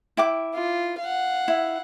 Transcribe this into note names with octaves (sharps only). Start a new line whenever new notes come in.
E4 G5 D6
F4
F5 F#5
E4